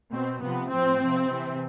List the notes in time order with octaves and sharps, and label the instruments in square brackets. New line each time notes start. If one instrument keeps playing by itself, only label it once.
[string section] B2 C4
C3 F3 B3
A2 F3 C4
C3 F3
C3 E3